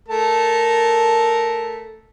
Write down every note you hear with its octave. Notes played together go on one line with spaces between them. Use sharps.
A3 A#4 A5